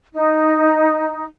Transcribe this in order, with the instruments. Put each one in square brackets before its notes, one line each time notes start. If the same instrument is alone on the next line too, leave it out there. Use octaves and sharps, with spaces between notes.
[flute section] D#4